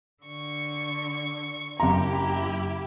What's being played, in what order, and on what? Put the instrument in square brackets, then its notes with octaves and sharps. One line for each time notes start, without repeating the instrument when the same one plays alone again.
[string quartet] D3 C#6
[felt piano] F#1 A#5 [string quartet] E4 G4